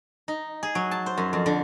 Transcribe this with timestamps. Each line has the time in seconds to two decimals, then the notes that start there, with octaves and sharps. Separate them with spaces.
0.28 D#4
0.63 G#4
0.75 F#3
0.91 A5
1.06 C5
1.18 F#2
1.33 F2
1.46 D3